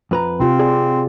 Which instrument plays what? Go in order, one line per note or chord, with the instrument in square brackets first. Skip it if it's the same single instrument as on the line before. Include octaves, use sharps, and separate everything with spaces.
[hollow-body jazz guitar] F2 B4 A#5
[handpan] C3 F4 G4 [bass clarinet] C4
[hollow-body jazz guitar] G#4 [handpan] D5